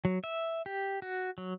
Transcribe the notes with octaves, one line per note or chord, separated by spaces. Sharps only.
F#3
E5
G4
F#4
F#3